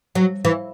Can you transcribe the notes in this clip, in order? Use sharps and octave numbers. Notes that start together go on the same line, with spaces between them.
F#3
E3